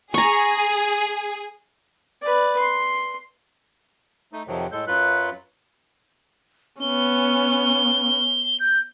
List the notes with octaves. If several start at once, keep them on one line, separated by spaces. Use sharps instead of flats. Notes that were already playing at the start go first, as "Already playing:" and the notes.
G#4 A#5 C#6
B4 D5
C6
A3 D#4
F2 C3 D#3 F3 F#3
A2 G#3 A4 G6
F#2 F#3 F4 B4 F#6
B3 C#4 G7
G6